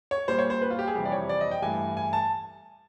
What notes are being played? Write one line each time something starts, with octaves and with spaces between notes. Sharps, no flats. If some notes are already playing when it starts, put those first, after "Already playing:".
C#5
A#2 G3 C5
C#5
C5
B4
F4
G4
G#4
F2 C3 E3 G3 G4
D5
C#5
D5
D#5
G5
G2 E3 A3 G#5
G#5
A5